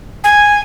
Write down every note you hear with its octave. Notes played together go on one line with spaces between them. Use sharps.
G#5